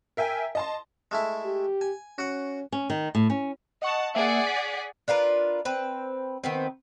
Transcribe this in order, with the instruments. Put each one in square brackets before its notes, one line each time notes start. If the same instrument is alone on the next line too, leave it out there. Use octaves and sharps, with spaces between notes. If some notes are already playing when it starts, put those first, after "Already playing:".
[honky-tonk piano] A#4 E5 G5 G#5
D#5 A5 C6
[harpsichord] G#3 A3 E4
[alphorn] G4
[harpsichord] G#5
[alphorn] C#4 [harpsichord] F#4 F#5
[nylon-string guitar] C#4
D#3
A2
C#4
[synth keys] D#5 C#6 [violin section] F#5 A5
[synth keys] A#3 E5 [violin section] G#4 D5 F#5
[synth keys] B6
[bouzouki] D4 F4 A#4 B4
C4 B4
D#3 B3 C4